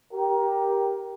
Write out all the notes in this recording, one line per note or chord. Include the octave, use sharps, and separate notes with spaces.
G4 A#4